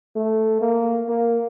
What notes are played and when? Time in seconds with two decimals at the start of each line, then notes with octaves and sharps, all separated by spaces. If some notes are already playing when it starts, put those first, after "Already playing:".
0.16 A3
0.61 A#3
1.09 A#3